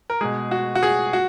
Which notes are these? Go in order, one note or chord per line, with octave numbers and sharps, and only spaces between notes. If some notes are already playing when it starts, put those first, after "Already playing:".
A#4
B2 G#3 G#4
F#4
F#4
G#4
F#4